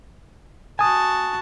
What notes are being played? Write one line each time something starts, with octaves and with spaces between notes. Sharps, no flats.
F#4 G#5 A5 D#6